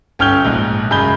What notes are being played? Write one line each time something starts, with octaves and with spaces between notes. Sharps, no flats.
G1 C#4 G5 F6 G6 G7
A#1 G#2 F#6
F#2 C#3 G#3 B5 G6 G7